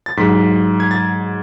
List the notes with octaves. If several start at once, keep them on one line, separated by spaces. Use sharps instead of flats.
A6
G#2 F#3 B6
G#6
A6